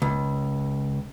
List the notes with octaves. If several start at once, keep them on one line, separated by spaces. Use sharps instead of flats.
C#2